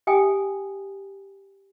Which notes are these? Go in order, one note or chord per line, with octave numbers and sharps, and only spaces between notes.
G4 E5 G5 G#5 D#6